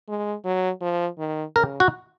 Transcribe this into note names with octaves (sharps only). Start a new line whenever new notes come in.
G#3
F#3
F3
D#3
C#3 A#4
F#4